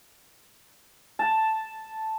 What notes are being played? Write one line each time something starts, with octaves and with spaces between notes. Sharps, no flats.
A5